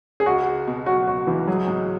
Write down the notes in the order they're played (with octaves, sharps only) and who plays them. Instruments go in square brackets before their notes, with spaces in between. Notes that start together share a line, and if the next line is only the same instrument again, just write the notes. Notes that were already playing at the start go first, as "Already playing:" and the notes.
[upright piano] G#4
[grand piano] C#2 [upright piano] F#4
[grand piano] C#2
B2
[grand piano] F#3 [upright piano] F#4
[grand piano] C#2 [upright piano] F#4
[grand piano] C#2 [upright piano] E3
[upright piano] F#3 [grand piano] G#4
[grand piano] G#2